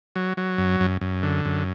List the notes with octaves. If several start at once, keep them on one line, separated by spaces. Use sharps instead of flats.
F#3
F#3
F#2
F#2
F#2
D3
F#2